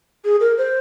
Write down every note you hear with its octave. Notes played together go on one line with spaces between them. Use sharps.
G#4
A#4
C5